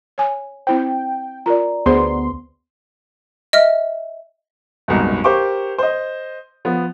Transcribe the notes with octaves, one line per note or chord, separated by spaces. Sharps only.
C#5 G#5
C4 E4 C5 G5
F4 A#4 D5 A#5
D2 B3 G#4 C5 C6
D#5 E5 F6
F#1 C2 G#2 B2
G4 A#4 C5 F5 C#6 D6
C5 D#5
F3 B3